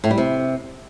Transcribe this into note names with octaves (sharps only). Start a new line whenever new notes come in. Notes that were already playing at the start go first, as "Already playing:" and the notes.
A2
G3
C3